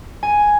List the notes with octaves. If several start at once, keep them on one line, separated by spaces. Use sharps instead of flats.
G#5